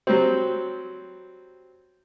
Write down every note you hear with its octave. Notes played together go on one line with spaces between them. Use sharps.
F#3 G3 C4